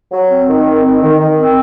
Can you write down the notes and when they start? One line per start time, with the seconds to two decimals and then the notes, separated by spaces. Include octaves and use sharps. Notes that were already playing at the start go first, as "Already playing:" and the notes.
0.10 F#3
0.29 C4
0.48 D#3
0.65 C4
0.83 D#3
1.02 D#3
1.20 D#3
1.39 C4